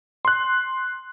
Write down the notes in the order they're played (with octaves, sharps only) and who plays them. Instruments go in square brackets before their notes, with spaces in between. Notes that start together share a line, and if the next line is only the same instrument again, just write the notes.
[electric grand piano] C6 F#6